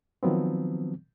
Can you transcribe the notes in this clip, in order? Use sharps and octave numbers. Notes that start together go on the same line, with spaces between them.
D#3 F3 F#3 B3 C4